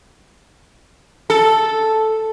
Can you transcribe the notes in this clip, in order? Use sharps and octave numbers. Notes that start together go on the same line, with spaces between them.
A4